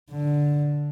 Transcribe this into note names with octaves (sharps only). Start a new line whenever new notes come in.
D3